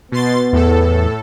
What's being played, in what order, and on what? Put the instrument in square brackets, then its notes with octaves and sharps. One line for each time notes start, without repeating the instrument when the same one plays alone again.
[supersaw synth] B2 C6 A6 [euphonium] B3
[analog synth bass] E2 [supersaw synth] A2 A4